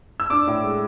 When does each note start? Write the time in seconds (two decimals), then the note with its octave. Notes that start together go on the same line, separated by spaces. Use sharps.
0.20 E6
0.30 D4 D6
0.47 A2
0.64 G#3